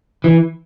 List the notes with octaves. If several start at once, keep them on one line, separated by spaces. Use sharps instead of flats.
E3